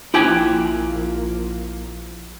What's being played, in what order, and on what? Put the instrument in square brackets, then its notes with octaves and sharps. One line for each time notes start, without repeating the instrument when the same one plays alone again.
[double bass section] A#1 F3 A#3 [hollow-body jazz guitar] E4 G5 G#5